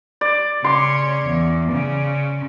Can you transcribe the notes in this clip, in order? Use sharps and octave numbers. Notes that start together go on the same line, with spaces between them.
D5
C#3 C#5 C6 D6
E2
C#3